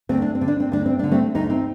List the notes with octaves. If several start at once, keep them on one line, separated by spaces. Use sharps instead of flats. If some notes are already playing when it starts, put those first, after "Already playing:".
D2 C4
D4
C4
D3
D4
C4
D2 D4
C4
D3 D4
A3 C4
D2 D#4
C4 D#4